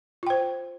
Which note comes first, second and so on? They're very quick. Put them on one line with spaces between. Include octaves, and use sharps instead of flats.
F4 G5 C5